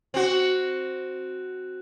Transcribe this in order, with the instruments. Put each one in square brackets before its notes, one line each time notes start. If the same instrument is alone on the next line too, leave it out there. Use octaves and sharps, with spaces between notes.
[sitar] C4 F#4